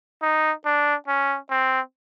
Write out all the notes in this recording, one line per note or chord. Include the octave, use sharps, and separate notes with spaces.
D#4
D4
C#4
C4